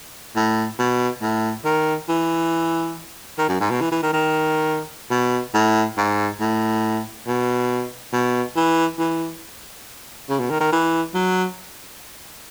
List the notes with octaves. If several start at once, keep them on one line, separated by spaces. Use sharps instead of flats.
A2
B2
A2
D#3
E3
D#3
F#2
G#2
B2
E3
E3
D#3
D#3
B2
A2
G#2
A2
B2
B2
E3
E3
C#3
B2
D#3
D#3
E3
F#3